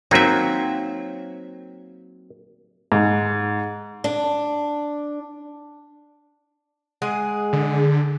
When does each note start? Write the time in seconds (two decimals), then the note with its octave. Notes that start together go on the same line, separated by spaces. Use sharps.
0.11 F#3 A#3 C4 D#4 E5
2.92 G#2
4.04 D4
7.02 G#3 G#4 F#5
7.53 D3